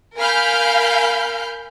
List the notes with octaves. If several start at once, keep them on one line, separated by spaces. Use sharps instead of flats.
A#4 F5 G#5 B5 F6 G6